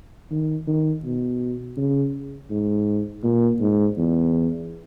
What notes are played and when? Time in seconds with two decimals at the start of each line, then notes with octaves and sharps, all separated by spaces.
0.31 D#3
0.67 D#3
1.04 B2
1.77 C#3
2.50 G#2
3.23 A#2
3.60 G#2
3.97 E2